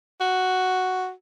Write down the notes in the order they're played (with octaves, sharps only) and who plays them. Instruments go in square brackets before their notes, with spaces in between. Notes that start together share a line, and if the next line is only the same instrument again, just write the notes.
[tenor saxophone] F#4